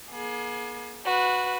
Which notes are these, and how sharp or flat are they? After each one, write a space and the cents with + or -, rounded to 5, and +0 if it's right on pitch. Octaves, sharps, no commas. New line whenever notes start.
A#3 +45 G#4 +30
F#4 -15 B4 +0